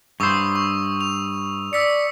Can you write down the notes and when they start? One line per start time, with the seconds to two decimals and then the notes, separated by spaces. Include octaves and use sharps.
0.20 G2 C5 C#6 D#6 E6
0.56 C#6
1.01 F7
1.73 D5 E6 B6 C#7